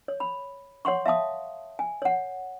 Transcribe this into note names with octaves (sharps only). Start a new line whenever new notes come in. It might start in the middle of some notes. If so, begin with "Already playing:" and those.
C#5
B5
C#5 F#5 C6 C#6
E5 F5 A5 D#6
G#5
C#5 F#5